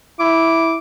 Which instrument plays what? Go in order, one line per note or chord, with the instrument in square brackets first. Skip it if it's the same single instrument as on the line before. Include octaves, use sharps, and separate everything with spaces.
[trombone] E4 [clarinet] D6